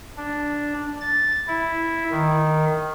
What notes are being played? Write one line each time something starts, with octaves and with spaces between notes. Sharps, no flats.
D4
A6
E4
D#3